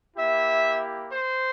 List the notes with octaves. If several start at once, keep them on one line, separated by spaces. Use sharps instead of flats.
A#3 E4 G4 E5
C5